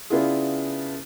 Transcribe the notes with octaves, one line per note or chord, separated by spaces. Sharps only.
C#3 B3 D4 E4 F4 G#4